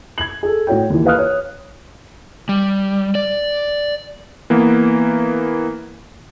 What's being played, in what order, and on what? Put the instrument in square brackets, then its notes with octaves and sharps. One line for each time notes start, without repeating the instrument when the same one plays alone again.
[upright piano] G#6 F#7
G#4 A4
A2 F#4 C#5 G5
D#2 E3
B4 F5 D#6 F6 F#6
C#5
[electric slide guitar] G3
D5
[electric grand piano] E3 A#3 B3